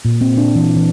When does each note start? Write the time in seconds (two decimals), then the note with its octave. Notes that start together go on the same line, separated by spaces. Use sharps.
0.05 A#2
0.21 C4
0.37 D4
0.55 E3
0.76 E3